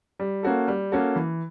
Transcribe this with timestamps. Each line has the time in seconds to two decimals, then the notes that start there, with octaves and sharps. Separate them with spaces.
0.19 G3
0.43 A#3 C#4 F#4 A4
0.68 G3
0.92 A#3 C#4 F#4 A4
1.16 E3